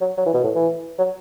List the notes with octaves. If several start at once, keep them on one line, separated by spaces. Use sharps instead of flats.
F#3
F#3
E3
B2
A2
E3
F#3